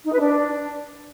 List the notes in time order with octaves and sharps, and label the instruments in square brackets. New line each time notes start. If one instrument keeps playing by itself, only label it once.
[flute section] D#4
B4
D4